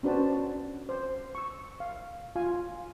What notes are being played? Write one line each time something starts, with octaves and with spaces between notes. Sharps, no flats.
C#4 D4 F#4 B4 C5 A5
C5
C#6 E6
F5
F4 F5 G#5